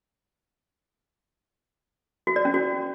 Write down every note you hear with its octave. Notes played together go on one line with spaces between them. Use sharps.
F#4
D5
C#4
F#4